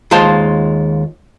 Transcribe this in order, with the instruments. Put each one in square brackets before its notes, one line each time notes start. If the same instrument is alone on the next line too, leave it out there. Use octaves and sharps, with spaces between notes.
[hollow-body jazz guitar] D#2 G#3 F4 C5 A5